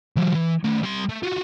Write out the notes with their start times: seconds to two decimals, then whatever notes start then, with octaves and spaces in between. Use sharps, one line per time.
0.16 E3 F#3
0.35 E3
0.64 D#3 A3
0.83 G3 C6
1.09 A3
1.23 F4 F#4